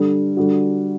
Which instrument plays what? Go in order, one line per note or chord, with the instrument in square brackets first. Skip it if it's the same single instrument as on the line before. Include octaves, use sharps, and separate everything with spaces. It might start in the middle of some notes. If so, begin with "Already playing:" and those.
Already playing: [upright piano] D3 G3 D4
D3 G3 D4 F#4